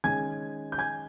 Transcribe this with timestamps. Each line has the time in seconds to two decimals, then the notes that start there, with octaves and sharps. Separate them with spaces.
0.04 D#3 G#3 C#4 G#5 G#6
0.72 G6
0.78 G#5 G#6